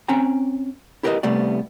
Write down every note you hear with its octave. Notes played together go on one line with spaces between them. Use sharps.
C4 C#4 G5 G#5 A#5
E4 G4 A#4 B4 C#5 D#5
C2 C3 G3 A3 B3 D5